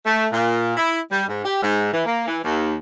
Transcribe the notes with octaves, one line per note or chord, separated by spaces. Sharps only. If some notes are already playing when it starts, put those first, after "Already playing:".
A3
A#2
E4
G3
G#2
G4
G#2
E3
A#3
E3
D#2